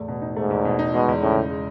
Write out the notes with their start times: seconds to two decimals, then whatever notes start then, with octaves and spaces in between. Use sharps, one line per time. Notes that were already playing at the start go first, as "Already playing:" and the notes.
Already playing: E2 A2 A3
0.08 B2
0.22 D#4
0.36 G#2 A3
0.50 E2
0.65 B2
0.79 D#4
0.93 B2 G#3
1.08 E2
1.21 A2 C#3
1.36 E2
1.50 G#3